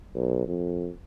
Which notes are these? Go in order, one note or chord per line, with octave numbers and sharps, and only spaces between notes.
B1
F2